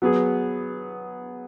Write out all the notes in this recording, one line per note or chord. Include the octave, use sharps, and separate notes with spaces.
F#3 B3 G#4